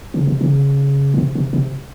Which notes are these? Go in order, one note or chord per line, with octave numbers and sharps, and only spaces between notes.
C#3
C3
C#3
A#2
C3
C3
C3